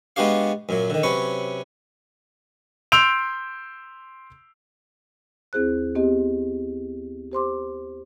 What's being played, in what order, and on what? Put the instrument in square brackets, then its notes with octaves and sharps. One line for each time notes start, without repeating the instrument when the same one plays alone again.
[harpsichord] G#3 B3 D4 F#4 G4 F5
F#2 A#2 F#3
D3 D#3
C3 F#3 C#4 B4 C#6
[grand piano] C6 E6 G6 D7 F7
[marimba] D#2 C4 E4 G#4 C5 F#6
B3 C4 G4 D#5
G4 C5 C6 D6